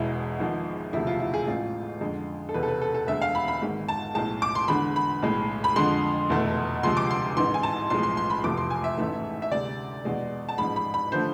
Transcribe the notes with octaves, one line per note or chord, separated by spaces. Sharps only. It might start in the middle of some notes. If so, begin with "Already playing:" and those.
Already playing: E1 E2 B2 G#3 E4
G#1 G#2 F3 G#3
E1 D2 C3 F3 A3 E4
F4
E4
G#4
A1 A2 G#3 F4
F2 D3 G#3
A4
E1 E2 C3 B4
A4
B4
A4
A4
E1 D2 D3 G#3 E5
F5
B5
B5
G#1 G#2 G#3
A5
B1 A2 G#3 A5
D6
C6
E2 D3 G#3 B5
B5
B1 A2 G#3
B5
F2 D3 F3 G#3 C6
F1 E2 B2 A3
D2 C3 F3 G#3 C6
D6
C6
A1 G#2 E3 C6
G#5
A5
B1 A2 F3 G#3 C6
C6
C6
B5
F1 E2 C3 F3 A3 D6
C6
G#5
E5
A1 G#2 E3 A3
E5
D2 C3 G#3 D5
E2 B2 G#3
A5
A1 G#2 F3 G#3 B5
B5
B5
D3 F3 A3 C5